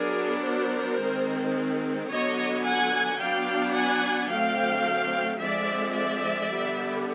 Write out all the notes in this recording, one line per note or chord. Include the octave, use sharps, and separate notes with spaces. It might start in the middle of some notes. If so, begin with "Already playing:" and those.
Already playing: F#3 B3 D4 G#4 A#4
A#4 C5
D#3 G#3 C4
D3 F#3 B3 C#5 D#5
F#5 G#5
F#3 B3 D4 F5 G5
F#5 G#5
D3 F#3 A3 C4 F5 G5
D3 F3 G#3 C4 D5 E5
D5 E5
D3 G3 B3